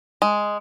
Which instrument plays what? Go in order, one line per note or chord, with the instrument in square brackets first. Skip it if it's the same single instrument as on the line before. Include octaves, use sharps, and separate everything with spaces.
[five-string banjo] G#3